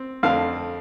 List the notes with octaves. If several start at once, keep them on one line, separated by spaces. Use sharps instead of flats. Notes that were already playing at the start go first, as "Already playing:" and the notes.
Already playing: C4
F2 D3 A3 C4 F5